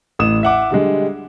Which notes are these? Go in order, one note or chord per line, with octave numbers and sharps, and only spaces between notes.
A1 D#6 E7
E5 F#5 D6
D3 G3 G#3